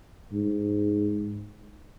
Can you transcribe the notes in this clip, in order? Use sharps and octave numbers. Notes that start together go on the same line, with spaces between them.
G#2